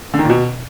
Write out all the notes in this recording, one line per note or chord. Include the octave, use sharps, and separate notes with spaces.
D3
D#3
A#2
B2